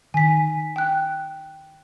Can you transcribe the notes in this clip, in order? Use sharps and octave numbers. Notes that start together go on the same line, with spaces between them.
D#3 G#5 B6
G5 F#6